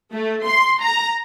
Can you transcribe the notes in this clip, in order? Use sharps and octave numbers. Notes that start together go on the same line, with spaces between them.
A3
C6
A#5